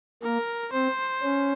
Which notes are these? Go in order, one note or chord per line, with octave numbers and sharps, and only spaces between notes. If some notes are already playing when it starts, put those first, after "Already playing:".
A#3 A#4
C4 C5
C#4